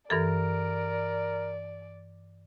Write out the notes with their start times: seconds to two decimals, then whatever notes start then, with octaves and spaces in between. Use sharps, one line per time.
0.10 G2 E3 A4 A#4 D5